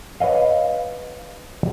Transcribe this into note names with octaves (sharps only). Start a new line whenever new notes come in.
B4 C#5 D#5 F5